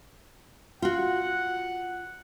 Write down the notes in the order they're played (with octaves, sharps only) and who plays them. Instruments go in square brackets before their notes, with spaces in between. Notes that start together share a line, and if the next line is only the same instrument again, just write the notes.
[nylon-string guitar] F4 F#4 [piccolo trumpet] F#5